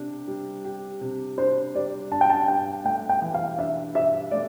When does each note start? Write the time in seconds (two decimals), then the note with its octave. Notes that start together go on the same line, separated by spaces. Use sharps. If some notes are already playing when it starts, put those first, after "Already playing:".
Already playing: C3 D4
0.28 G3
0.64 G4
1.01 C3
1.38 D4 C5
1.75 G3 D5
2.11 D4 A5
2.21 G5
2.30 A5
2.48 G2 G5
2.85 A3 G5
3.09 G5
3.22 E3
3.34 F5
3.58 D4 E5
3.95 G2 E5
4.31 A3 D5